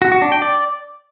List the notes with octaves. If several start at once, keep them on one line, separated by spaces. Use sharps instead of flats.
F#4
F#4
D4
G5
D5